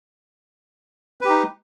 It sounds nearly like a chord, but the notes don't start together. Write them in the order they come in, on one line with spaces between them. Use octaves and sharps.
B4 G4 D#4